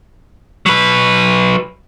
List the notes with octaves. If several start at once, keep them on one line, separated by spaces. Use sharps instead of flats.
F#3 B4